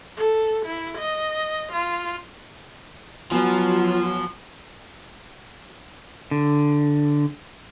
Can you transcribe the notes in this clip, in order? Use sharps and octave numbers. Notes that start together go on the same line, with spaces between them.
A4
E4
D#5
F4
F3 F#3 B3 F4 G#5
D3